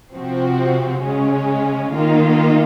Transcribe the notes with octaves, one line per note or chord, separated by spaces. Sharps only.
C3 F3 C4 F#4
C#3 G#3 C#4
D#3 A#3 F4